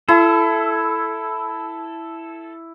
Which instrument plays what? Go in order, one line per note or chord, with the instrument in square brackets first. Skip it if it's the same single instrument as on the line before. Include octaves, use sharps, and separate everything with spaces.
[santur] E4 [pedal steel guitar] A4